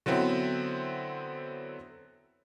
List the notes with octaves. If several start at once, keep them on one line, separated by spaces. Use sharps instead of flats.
D3 F#3 B3 C4 E4